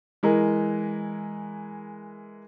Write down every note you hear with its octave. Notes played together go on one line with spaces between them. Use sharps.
E3 G#3 A#4